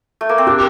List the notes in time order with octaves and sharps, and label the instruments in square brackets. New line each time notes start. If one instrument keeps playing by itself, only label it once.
[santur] A3
A#3
C4
[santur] D4 [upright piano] G4